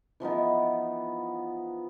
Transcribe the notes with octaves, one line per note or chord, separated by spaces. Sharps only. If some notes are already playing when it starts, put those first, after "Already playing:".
E3 F3 B3 D#4